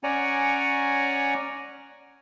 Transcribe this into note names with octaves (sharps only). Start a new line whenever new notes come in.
C#4 C#5 D5 F#5 G#5 A#5